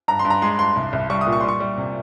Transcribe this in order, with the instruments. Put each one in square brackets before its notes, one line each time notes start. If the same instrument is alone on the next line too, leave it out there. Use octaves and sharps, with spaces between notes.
[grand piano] G2 A#5
C6
G2
A#5
G#3 C6
G2 C6
C2
C2
G3 C#6
D#6
A#2
C#6
C6
G3 C#6
G3
C3